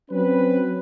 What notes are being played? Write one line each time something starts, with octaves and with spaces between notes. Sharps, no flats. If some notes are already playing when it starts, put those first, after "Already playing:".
F#3 C4 C#4 B4